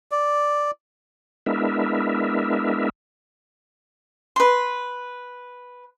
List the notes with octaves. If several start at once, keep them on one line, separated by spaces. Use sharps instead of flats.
D5
G#3 B3 D4 E4 A#4 E5
B4 C6